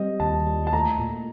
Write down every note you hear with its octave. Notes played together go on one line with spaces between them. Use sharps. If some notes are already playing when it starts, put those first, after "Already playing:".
Already playing: G3 C4 D#5
D#2 A5
G3
A5
A3 A#5
A#2